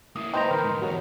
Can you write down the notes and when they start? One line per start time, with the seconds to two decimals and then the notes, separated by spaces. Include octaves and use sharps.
0.16 A#3 E4 D#6
0.33 D#4 B4 C5 G5 A#5 C6
0.51 D2 E3 A#4 B4
0.64 G#2 E3
0.81 E2 F#4 C#5 A#5